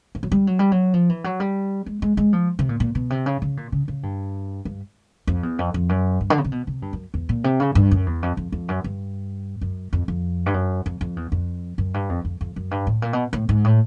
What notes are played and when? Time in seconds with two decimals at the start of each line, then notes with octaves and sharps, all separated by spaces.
0.15 F3
0.23 F#3
0.32 G3
0.47 F#3
0.59 G3
0.72 F#3
0.94 F3
1.09 E3
1.24 F#3
1.40 G3
1.86 G#3
2.02 G#3
2.17 G#3
2.33 F3
2.59 C3
2.69 A#2
2.80 A#2
2.95 B2
3.10 C3
3.26 C#3
3.42 C#3
3.57 A#2
3.72 C#3
3.88 C#3
4.03 G2
4.65 G2
5.27 F2
5.43 E2
5.59 F2
5.74 F2
5.89 F#2
6.21 G2
6.30 D3
6.38 C#3
6.44 C3
6.52 B2
6.67 C3
6.82 G2
6.93 F#2
7.14 E2
7.29 A#2
7.44 C3
7.60 C#3
7.75 G2
7.91 F#2
8.06 E2
8.23 F2
8.37 F2
8.52 F2
8.68 F#2
8.84 G2
9.61 F#2
9.93 F2
10.08 F2
10.46 G2
10.54 F#2
10.86 F2
11.01 F2
11.16 E2
11.32 F2
11.78 F#2
11.94 G2
12.09 F2
12.25 F2
12.41 F2
12.56 F#2
12.71 G2
12.87 A2
13.02 A#2
13.13 B2
13.33 A2
13.49 G#2
13.64 A2